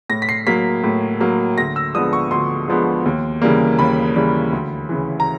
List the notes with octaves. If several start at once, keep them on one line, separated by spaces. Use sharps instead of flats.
A2 A#6
B6
C7
F#3 A#3 B6
A2
F#3 A#3
D2 A#6
E6
D3 F3 G#3 B3 D#6
C#6
D2 C6
D3 F3 G#3 B3
D#2
C#3 E3 G3 A#3
D#2 B5
C#3 E3 G3 A#3
D2
C#3 E3
A#5